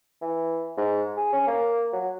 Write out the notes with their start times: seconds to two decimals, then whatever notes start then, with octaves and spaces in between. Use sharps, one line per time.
0.22 E3
0.77 G#2
1.17 G#4
1.33 C#4
1.48 A#3
1.93 F#3